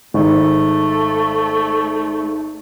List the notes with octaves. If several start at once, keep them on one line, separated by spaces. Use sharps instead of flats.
G#1 A3